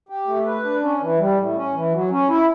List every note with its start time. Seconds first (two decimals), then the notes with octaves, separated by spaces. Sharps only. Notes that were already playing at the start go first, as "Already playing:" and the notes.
0.09 G4
0.28 A3
0.46 B4
0.64 D4
0.83 C#4
1.01 E3
1.19 G3
1.38 A2
1.56 C#4
1.74 E3
1.93 F#3
2.11 C#4
2.29 E4